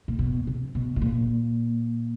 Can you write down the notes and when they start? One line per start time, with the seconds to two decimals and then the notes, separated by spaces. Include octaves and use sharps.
0.08 A#2
0.19 B2
0.47 C3
0.75 B2
0.96 B2
1.02 A#2